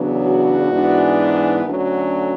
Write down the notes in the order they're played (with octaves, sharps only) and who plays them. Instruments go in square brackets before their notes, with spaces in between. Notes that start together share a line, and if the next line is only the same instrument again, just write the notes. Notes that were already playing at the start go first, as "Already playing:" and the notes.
Already playing: [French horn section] E2 C#3 F#3 B3 D4
F#4
G#2 E3 B3 D4
D2 D3 F#3 C#4